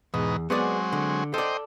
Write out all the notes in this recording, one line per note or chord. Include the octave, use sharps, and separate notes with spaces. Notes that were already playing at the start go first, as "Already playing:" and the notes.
E2 G#2 B2 D#4
F#3 G#3 B3 C4 G#4 D5
D3
A4 C5 D5 D#5 G5